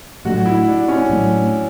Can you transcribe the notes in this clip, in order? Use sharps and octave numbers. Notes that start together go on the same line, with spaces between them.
A2 F#3 A3 D4 F#4
E4
D4
C#4
A2 F#3 A3 D4